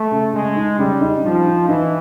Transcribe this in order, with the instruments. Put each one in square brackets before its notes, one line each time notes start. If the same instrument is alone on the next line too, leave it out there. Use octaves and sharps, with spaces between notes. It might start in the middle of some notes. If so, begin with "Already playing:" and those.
Already playing: [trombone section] A3
[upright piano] C#3
[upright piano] C#3 [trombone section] G#3
[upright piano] D#4
[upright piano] C#3 [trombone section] G3
[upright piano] D#4
[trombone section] F3 [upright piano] D#4
[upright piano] D#4
[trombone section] E3 [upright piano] D#4